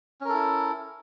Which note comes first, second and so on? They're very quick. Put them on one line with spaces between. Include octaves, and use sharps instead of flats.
C#4 A#4 A4 E4